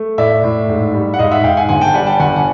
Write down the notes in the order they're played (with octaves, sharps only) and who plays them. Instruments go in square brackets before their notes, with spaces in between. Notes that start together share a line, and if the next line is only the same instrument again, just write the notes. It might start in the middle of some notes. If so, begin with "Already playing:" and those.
Already playing: [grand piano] A3
A2 D5 E5
A2
G#2
G3
F#5
G#2 D#5 F5
E5 F#5
G#2 F5 G5
F#5 G#5
G1 F#5 G#5
G5 A5
G3 F#5 G#5
G5 A5
G1 F#5 G#5
F#5